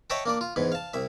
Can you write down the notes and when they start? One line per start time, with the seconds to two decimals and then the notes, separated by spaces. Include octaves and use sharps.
0.10 C#5 D#5 E5 F#5 G5 A5
0.26 A#3 D4 D5
0.41 F4
0.56 E2 G#2 B3
0.72 F5 A5
0.94 C2 E5